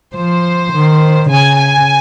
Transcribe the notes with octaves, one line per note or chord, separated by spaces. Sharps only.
F3 C5
D#3
C#3 G#5
G#5